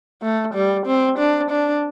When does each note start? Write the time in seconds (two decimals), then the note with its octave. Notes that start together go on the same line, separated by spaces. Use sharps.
0.22 A3
0.54 G3
0.87 C4
1.19 D4
1.51 D4